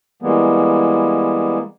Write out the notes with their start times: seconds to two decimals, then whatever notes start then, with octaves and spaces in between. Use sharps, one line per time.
0.22 E3 G3 G#3 A#3 B3